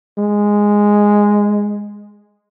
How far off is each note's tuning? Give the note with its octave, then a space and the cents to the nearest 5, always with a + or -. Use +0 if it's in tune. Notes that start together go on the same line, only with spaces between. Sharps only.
G#3 -5